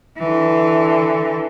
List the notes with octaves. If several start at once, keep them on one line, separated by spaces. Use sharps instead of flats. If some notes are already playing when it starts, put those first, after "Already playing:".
D3 E3